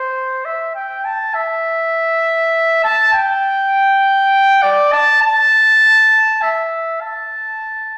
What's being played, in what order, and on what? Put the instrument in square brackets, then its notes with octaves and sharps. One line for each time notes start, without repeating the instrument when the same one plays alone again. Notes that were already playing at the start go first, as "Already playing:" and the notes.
Already playing: [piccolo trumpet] C5
E5
G5
A5
E5
A5
G5
D5
A5
A5
E5
A5